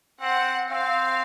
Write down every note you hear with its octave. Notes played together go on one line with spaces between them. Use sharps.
C4 F#5
C4 F5